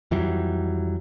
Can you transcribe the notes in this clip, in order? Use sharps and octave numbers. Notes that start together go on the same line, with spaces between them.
F2 E3 F#3 G3